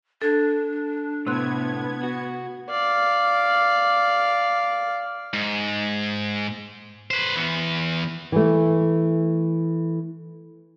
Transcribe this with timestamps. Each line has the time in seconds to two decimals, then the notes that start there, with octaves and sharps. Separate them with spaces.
0.22 D4 A4 G#6
1.27 A2 C3 B3 C6 F#6 G#6
2.03 F#4
2.70 D5 F5
5.33 G#2
7.11 B4 C5
7.36 E3 B3
8.32 E3 A3